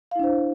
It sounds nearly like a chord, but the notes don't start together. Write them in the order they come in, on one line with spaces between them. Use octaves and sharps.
F5 E4 D4 C5